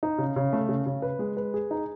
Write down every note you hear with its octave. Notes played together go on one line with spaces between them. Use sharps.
D#4
C#3
C#3
A3
C#3
C#3
B4
G#3
B4
G#4
D#4